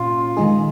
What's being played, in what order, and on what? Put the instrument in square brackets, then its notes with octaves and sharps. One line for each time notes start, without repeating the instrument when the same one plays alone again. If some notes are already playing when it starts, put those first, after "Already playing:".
Already playing: [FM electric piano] A#2 C#4 [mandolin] F4
[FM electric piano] D#3 G#3 D#4 G#4